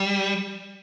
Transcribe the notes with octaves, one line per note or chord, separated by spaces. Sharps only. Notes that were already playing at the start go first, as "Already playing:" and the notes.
Already playing: G3